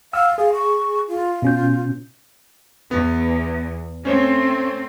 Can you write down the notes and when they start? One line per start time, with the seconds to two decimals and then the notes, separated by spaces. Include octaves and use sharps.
0.13 F5 F#5 E6 F6
0.38 G#4 F5
0.53 C#6
1.08 F4
1.42 B2 C#4 G6
2.91 E2 B3
4.05 A3 C4 C#4 C5 C#5